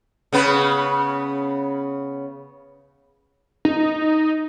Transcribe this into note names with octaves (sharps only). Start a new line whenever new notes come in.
C#3 B3 B4
D#4